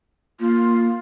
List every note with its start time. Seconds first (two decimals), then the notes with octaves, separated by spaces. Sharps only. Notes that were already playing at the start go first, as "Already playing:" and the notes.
0.40 A#3 F4